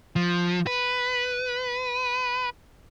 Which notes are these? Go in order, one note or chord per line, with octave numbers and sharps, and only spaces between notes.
F3
B4